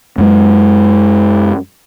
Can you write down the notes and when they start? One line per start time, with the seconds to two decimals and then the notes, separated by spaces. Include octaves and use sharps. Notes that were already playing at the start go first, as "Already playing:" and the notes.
0.18 F#2 G#3